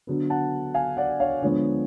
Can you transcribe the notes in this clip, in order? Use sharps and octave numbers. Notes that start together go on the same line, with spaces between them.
D3 F#3 B3
F#5 A5
F5 G#5
D5 F#5
C#5 F5
D3 F3 G#3 B3 C#5